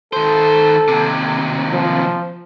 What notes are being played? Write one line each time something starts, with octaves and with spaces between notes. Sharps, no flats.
D#3 A4 C5
D#2 C3
F3